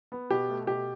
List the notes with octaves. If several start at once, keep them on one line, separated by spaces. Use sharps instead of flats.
B3
B2 G4
A3
B2 G4